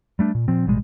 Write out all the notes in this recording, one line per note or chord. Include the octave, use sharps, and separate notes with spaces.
G3 A3 D4
A#2
A#2 F3 C4
A1 B2 G3 G#3